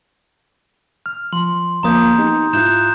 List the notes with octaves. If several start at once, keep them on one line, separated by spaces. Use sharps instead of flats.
F6
F3 C6
D2 F3 A#3 A#5 D#6 G6
B3 D#4 G4
G#2 E4 F4 F#6 G6 E7